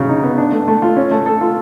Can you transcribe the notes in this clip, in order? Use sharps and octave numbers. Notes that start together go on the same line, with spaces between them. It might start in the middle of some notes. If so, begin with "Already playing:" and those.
Already playing: C#3 F#3
D#4
B3
D4
A3
A3
F4
C#4
A3
A4
F4